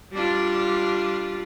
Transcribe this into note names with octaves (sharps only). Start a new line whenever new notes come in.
G3 D4 F4